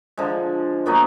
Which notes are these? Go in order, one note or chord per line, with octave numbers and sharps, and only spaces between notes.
D3 F3 G#3
A#2 F#3 B3 D#4